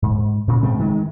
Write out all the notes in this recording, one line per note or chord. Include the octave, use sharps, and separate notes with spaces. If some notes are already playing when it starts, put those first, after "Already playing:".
G#2
A#2 C#3
G#2 C#3 A3 C4
D#3 G#3 A3